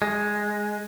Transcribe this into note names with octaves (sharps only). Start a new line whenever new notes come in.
G#3